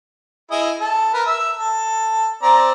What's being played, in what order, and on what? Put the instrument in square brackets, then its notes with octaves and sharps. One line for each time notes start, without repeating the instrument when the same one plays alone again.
[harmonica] E4 G#4 D#5
A4
A#4 B4
E5
A4
C4 D5 A#5